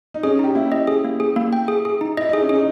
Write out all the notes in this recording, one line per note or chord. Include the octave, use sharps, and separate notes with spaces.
D#4
C#4 G#4
D#4 G4
A#3 E4
D#5
G#4
A#3
G#4
A#3
G5
G#4
G#4
D#4
E4 D#5
D#4 G#4
C#4
G#4
D#4